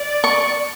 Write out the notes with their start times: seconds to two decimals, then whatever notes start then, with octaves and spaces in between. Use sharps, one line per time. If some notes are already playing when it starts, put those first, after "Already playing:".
Already playing: D5
0.24 C#6